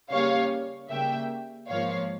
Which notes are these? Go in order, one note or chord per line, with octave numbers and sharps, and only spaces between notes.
C#3 G3 A#3 C#4 C#5 F5
C#3 G3 A#3 E5 G5
G#2 F3 A#3 C#5 F5